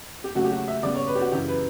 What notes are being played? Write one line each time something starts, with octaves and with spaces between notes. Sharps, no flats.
G4
C#3 F#3 A3 C#4 F#4
G4
F#4
E5
C#3 G3 B3 D5
C#5
B4
G4
F#4
F#2 C#3 E3 G4
B4